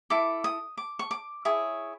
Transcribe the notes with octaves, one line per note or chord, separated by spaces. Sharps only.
E4 A4 D6
D#6
D6
C#6
D6
E4 G#4 C#5